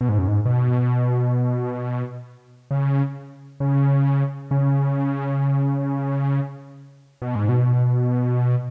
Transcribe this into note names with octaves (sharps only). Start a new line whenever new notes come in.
B2
G#2
F#2
G#2
B2
C#3
C#3
C#3
B2
G#2
B2